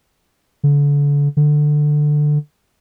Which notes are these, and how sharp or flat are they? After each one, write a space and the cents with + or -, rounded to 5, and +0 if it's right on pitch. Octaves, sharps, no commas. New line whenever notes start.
D3 -35
D3 +15